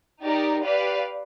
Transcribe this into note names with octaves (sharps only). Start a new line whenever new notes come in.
D#4 G4 A#4 D5
G4 B4 D5 F5